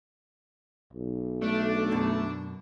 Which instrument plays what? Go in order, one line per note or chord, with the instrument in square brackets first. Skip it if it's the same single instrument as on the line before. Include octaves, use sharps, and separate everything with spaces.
[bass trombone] B1
[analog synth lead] A3 [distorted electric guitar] D4
[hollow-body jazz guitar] F#2 B2